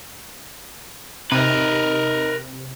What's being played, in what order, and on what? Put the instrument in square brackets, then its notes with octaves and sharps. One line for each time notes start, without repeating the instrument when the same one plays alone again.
[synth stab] C3 [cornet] D#4 [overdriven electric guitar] A#4 B4